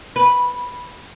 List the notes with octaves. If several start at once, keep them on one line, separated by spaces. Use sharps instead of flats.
B4